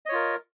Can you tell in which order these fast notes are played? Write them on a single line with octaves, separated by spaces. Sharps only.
D#5 C#5 F4 A#4